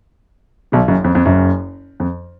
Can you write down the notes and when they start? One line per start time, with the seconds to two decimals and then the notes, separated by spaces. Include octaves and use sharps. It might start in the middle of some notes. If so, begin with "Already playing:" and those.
0.72 B1 B2
0.88 F#1 F#2
1.04 F2
1.15 F2
1.25 F#1 F#2
2.00 F2